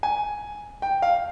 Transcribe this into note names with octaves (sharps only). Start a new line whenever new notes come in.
G#5
G5
F5